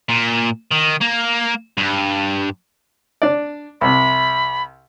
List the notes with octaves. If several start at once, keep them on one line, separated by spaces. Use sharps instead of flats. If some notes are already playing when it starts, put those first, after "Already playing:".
A#2
D#3
A#3
G2
D4 D5
C2 C3 B5